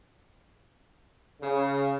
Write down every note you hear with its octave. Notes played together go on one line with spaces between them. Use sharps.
C#3